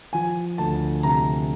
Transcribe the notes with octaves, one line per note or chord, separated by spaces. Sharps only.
F3 G#5
D2 A5
C3 A#5